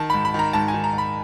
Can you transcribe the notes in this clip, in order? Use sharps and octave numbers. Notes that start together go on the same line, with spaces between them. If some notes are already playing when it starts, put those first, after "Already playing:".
Already playing: D#3 A5
G#2 B5
B5
D#3 A#5
G#2 A5
G#5
D#3
A#5
G#2
B5